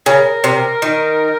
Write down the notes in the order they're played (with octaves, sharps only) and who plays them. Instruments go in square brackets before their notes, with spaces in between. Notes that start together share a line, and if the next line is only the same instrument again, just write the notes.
[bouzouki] C#3 [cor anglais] A#4
[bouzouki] C3
D#3